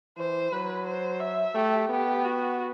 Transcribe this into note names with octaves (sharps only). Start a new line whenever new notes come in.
E3 C5
F#3 B4
C5
E5
A3 G4
B3 G4
F#4